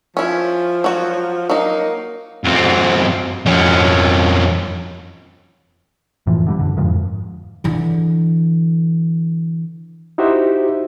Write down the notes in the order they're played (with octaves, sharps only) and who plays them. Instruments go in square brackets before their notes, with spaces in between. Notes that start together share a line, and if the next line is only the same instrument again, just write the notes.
[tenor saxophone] F3 [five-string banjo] C#4 E4
[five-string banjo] F#3 F#4
[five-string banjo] F#3 D#4 [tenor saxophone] A#3
[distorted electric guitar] F#2 C4
F2 C#4
[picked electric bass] F#2 A2 E3 F3
D3 F#3 G3
F#2 D3
F2 G#2 F3
[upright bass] D3 E3
[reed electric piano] D#4 E4 F#4 G4 C5 E5